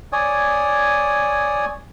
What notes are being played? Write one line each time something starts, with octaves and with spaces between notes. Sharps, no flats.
C#5 D5 G#5 D#6